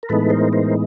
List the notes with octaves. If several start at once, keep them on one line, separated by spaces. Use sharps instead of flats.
A#4
A2 E3 G#3 B3 D#4 A4 B4
A#4 C5
A#4 C5